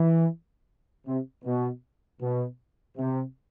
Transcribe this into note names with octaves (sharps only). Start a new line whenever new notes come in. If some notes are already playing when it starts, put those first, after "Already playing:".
Already playing: E3
C3
B2
B2
C3